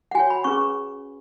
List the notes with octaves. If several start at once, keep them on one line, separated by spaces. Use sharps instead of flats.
F#5
F#4 C#5 G#5
B5
C#4 G#4 B4 C#6